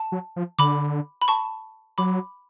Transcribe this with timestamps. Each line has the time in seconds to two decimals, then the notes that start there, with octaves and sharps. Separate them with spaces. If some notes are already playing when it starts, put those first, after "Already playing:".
Already playing: A5
0.12 F#3
0.36 F3
0.59 D3 B5 D6
1.21 B5
1.28 A5 C#6
1.98 F#3 B5 D6